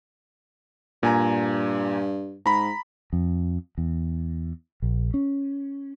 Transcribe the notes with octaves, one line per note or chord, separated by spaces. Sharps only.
G2 A#2 G#5 A#5
G#2 A#5 B5
F2
E2
A#1
C#4